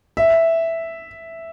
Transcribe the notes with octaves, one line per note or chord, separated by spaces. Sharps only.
E5